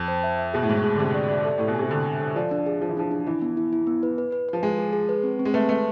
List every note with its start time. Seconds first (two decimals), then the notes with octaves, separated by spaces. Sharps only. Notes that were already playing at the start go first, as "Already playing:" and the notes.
Already playing: F2
0.08 C5
0.24 E5
0.39 E5
0.54 B2 G#4
0.62 A2
0.69 G#2 G#4
0.77 A2
0.84 G#4
0.95 D3
0.99 C3 G#4
1.14 D5
1.29 D5
1.45 A4
1.58 A2 A4
1.68 B2
1.75 C3 G#5
1.90 D3 A4
2.06 G#5
2.20 A4
2.36 F3 D5
2.51 D4
2.66 G#4
2.81 F3 G#4
2.89 E3
2.97 F3 D4
3.11 D4
3.27 E3 E4
3.42 B3
3.57 E4
3.73 E4
3.87 B3
4.03 B4
4.18 B4
4.32 B4
4.49 F3 B4
4.63 G#3 G#5
4.79 G#4
4.93 G#4
5.09 B4
5.24 C4
5.39 C4
5.45 G#3
5.54 A3 B4
5.69 A3 B4